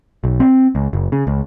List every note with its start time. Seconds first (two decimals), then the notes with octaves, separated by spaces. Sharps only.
0.24 B1
0.40 C4
0.75 C#2
0.93 F#1
1.12 C#3
1.27 C#2